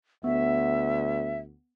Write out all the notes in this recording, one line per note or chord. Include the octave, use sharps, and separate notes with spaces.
D2 B3 E5